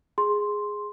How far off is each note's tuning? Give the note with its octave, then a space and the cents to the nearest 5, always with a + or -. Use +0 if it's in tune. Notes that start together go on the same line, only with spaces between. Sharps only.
G#4 +0 C6 +0